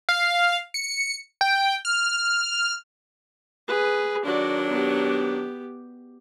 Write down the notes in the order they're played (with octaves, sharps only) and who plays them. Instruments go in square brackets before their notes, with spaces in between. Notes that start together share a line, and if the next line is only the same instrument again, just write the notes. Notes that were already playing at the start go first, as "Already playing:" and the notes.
[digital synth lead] F5
C#7
G5
F6
[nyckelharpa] G#4 B4
[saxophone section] D#3 F#3 D4 [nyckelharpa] F#4 D5
[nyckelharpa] B3 G4